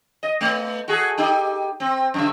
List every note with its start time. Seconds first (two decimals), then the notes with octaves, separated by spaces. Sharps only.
0.23 D#5
0.41 A3 B3
0.88 F#4 G#4 A4
1.18 D#4 G4
1.80 C4
2.14 F#2 D3 E5